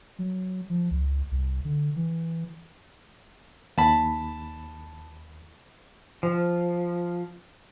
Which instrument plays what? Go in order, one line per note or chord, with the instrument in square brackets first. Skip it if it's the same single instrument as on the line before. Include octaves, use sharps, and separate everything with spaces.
[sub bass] F#3
F3
C#2
C2
D3
E3
[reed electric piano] D#2 B5 [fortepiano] A5
[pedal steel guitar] F3